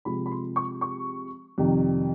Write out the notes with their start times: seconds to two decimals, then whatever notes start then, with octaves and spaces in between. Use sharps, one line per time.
0.05 C3 F3 G#3 B5
0.26 B5
0.32 C6
0.56 C#6
0.81 C#6
1.58 F2 C3 D#3 G3